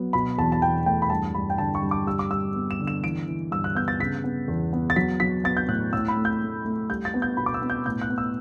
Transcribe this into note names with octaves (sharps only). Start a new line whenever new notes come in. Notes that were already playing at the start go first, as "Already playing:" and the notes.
Already playing: F#3 B3
B2 B5
E2 A5
A5
E2 G5
A3 G5
B5
G2 A5
G2 B5
G5
D3 A5
C#6
G2
D6
G3 E6
D6
G3 E6
B3
E7
D3
E7
E3 D7
E3
G2 E6
F#6
B3 G6
A6
C#3 B6
B3
E2
B3
A6
F#3 B6
F#3 B6
B3 A6
G6
A2 F#6
A2 E6
B5
A3
G6
A3
A3
G3 G6
A6
B3
G6
B2 B5
D6
E6
B3
G6
A2 G6
F#6
B3
E6